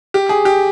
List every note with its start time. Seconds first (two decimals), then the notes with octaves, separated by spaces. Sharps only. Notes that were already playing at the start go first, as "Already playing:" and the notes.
0.14 G4
0.29 G#4
0.45 G4